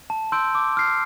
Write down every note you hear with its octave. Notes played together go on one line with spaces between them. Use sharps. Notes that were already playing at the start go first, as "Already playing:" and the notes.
A5
C6 E6 G6 D7
D6
F6 C7